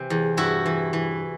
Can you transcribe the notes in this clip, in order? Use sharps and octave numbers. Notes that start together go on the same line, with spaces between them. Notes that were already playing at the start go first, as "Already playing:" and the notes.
Already playing: C3 E3
E2
G2 E4 F#4
E3
E3